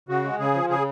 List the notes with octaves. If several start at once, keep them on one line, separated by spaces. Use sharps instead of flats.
C#3 F#4
G#3
C#3 G#4
F3
C#3 G#4